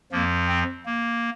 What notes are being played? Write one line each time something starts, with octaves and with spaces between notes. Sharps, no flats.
F2 F3 A#3
C4
A#3